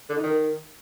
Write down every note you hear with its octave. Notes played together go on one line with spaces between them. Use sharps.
D3
D#4
D#3